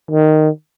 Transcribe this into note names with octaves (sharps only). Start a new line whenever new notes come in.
D#3